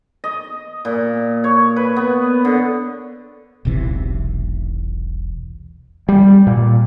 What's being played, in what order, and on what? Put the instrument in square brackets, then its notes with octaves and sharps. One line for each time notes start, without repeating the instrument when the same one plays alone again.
[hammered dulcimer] D#5
A#2
C#5
B4
B3
D3
[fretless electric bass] E1 B1 C3 E3
[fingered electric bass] G3
A#2